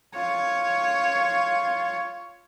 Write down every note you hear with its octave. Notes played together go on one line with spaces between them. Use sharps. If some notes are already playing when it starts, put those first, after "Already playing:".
F4 C#5